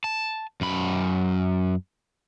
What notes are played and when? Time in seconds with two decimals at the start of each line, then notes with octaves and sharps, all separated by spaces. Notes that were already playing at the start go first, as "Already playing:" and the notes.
0.04 A5
0.61 F#2 B5